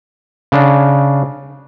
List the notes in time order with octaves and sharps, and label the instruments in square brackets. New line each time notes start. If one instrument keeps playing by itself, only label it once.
[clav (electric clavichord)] C#3 D4